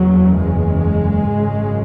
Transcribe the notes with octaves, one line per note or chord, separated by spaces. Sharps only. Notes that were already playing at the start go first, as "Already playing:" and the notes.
Already playing: F#1 E2 C#3 F#3
G#3
G#1 F#2 C#3